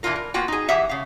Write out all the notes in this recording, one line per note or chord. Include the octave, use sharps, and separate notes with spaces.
D3 E3 F#3 D4 F4 A#4
A#4
A#3 B3 F4 F#4 G5
D#4 G#4
E3 G4 G#4 E5 F#5
C#3 F5